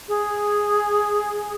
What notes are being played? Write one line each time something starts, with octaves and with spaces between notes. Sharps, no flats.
G#4